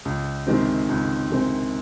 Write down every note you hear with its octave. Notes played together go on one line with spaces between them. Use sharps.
C#2
C3 D#3 G#3 C4
C#2
C3 D#3 G#3 C4